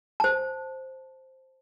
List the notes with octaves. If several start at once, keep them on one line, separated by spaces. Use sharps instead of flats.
C5 A5